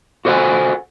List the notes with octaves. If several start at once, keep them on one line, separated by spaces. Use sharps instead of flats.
F#4 A4 C5 D#5 F#5 G#5